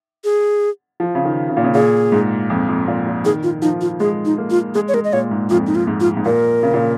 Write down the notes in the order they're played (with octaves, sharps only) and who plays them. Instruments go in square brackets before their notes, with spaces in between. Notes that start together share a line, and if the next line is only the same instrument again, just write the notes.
[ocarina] G#4
[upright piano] F3
C#3
D#3
C#3
A#2
C#3
[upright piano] A#2 [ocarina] G#4
[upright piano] G#2
F2
F2
A#2
A#2
[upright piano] D#3 [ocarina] G#4
[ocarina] F4
[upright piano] F3 [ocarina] D#4
[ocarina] F4
[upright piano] G#3 [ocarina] G#4
[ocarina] D#4
[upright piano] A#3
[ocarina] F4
[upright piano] G#3 [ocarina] G#4
[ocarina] C#5
[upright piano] G#3 [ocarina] A#4
[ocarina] D#5
[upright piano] A#2 [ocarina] C#5
[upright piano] G#2
[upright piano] F2 [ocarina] F4
[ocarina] D#4
F4
[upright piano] G#2
[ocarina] F4
[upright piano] G#2
[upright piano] A#2 [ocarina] A#4
[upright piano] C#3
A#2